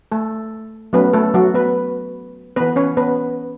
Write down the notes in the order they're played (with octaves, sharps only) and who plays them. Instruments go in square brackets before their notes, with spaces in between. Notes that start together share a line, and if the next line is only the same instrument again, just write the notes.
[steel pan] A3 A4
F#3 A3 B3 C#4 B4
A3 A4
F#3 F#4
B3 B4
B3 B4
E3
C#4 C#5
B3 B4